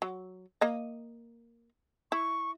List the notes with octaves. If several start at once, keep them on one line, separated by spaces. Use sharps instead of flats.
F#3
A#3 D#5
E4 C#6